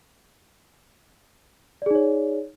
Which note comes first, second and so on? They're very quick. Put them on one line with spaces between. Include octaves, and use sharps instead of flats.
D5 G#4 D#4 C#5